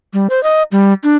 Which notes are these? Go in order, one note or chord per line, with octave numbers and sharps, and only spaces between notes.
G3
C5
D#5
G3
D4